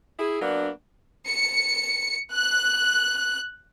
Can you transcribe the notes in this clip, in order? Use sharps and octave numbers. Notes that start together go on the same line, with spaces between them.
E4 G#4
F#3 A#3 B3 D4
C#7
F#6